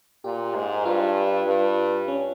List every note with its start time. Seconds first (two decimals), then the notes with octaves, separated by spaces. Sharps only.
0.24 A#2 G4
0.55 G#2
0.85 G2 F4
1.47 G2
2.08 C#4